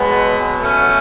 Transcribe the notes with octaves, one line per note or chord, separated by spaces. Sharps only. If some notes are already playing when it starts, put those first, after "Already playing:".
Already playing: B2 F#3 G#3 B3
A3 C#4